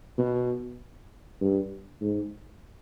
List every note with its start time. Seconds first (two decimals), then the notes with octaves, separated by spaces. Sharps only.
0.18 B2
1.41 G2
2.01 G#2